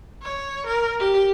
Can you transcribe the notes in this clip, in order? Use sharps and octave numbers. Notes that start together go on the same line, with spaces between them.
C#5
A#4
G4